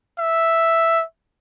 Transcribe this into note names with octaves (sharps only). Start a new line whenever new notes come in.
E5